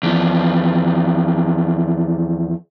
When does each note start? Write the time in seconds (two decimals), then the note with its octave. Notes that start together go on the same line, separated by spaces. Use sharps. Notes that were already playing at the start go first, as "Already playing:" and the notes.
0.03 E2 F3